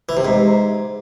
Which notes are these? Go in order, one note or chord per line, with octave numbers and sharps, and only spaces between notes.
E3
C3
G#2